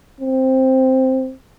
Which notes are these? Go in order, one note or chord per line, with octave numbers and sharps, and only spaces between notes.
C4